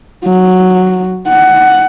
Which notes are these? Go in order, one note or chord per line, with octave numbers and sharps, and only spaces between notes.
F#3
F#5